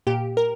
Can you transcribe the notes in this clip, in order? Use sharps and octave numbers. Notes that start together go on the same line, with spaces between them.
A#2 G4
A#4